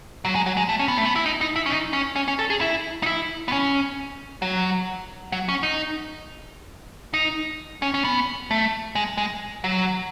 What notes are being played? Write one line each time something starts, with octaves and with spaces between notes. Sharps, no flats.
F#3
G#3
F#3
G#3
A3
C#4
B3
A3
B3
E4
D#4
D#4
E4
C#4
D#4
C#4
C#4
C#4
A4
G#4
E4
D#4
E4
B3
C#4
F#3
F#3
C#4
D#4
D#4
C#4
C#4
B3
A3
G#3
G#3
F#3